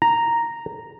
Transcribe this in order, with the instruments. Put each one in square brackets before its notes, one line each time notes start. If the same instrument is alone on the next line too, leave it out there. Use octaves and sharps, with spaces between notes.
[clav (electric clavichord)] A#5